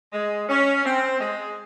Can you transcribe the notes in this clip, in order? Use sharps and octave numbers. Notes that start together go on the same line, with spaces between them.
G#3
C#4
C4
G#3